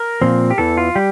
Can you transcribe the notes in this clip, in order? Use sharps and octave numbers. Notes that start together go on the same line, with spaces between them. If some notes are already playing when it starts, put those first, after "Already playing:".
Already playing: A#4
A#2 F3 C4
G4
E2 E3 A4
F4
G3 G4